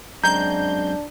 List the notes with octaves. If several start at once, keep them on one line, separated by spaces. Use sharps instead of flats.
F#2 G#3 C4 D4 A#5 G6